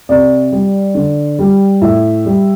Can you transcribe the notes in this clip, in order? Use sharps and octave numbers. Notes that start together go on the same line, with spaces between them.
C3 D5
G3
D3
G3
A2 E5
G3